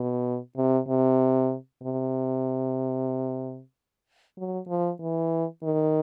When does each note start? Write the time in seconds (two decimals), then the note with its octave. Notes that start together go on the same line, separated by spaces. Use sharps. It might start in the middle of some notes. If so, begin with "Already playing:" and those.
Already playing: B2
0.57 C3
0.88 C3
1.84 C3
4.37 F#3
4.68 F3
5.01 E3
5.64 D#3